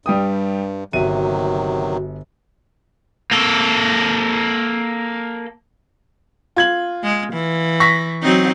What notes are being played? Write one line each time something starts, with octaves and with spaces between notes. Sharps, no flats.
G2 G3 G5 D#6
G1 C3 D#3 F#3 F#4 E5 D#7
A#3 A4
F4 G#6 F#7
G#3
E3
C#6 A#6 B6
F#3 C4 D#4